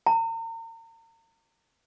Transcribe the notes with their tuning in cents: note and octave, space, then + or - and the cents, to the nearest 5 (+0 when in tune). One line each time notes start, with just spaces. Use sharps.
A#5 -40